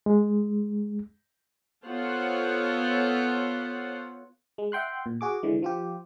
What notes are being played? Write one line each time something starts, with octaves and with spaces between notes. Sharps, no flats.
G#3
B3 F4 A4 C5 C#5 F#5
G#3
E5 F#5 G5 C6 F#6
A#2
F#4 G#4 D6
D3 E3 G#3
F3 F4 G4